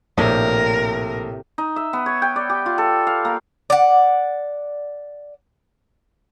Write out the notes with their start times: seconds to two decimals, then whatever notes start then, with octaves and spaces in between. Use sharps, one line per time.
0.18 A#1 A2 C3 A#4
1.58 D#4
1.76 E5
1.93 B3
2.06 C#5
2.22 G5
2.36 D5
2.50 G4
2.66 F4
2.78 A4
3.07 F5
3.25 A#3
3.70 D5 F#5